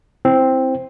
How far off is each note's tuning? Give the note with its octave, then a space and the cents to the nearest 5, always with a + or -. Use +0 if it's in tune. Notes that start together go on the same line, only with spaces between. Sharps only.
C4 +5 E4 +0